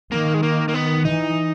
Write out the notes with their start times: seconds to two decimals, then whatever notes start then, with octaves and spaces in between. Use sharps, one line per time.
0.11 D#3 A#3
0.34 G#3
0.43 A#3
0.68 A#3
0.74 B3
1.05 E3 D#4